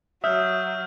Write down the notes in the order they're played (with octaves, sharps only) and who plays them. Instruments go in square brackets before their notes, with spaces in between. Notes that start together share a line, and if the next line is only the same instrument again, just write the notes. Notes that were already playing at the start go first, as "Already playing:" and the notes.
[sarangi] F#3 [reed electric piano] E5 [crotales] D#6 F6 G6